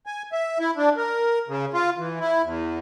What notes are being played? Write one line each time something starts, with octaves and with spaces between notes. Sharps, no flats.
G#5
E5
E4
D4
A#4
C#3
F4
E3
E4
E2